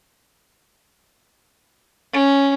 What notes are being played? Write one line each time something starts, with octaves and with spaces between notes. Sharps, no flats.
C#4